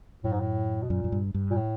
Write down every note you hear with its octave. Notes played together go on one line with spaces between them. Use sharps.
F#2 A2
G#2
A2
B2
F#2 A#2
F#2
G2
G2
A#2
A2